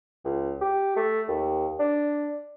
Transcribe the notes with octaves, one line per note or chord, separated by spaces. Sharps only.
C#2
G4
A3
D#2
D4